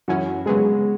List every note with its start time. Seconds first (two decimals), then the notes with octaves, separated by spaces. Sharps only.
0.08 F#2 E3 C#4 E4 F#4
0.46 C#3 F#3 G#3 B3 G#4